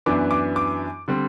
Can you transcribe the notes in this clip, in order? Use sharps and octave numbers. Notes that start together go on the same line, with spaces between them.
F#2 E3 B3 D4 D6
D6
D6
D3 G3 C4